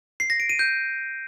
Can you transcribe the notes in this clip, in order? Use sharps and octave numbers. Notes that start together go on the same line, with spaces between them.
C7
A#6
D7
D#7
G6